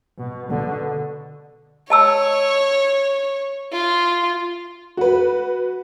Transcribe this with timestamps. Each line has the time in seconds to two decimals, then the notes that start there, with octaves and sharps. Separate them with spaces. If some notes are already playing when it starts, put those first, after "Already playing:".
0.18 B2
0.50 B2 D3
1.90 C#5 D#5 A5 E6
3.73 F4
4.97 F#4 B4